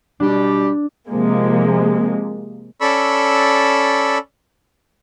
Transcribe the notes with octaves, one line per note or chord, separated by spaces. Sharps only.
B2 G3 D4 G4
C3 F3 G#3 A#3
C#4 A4 D5 B5 C#6 E6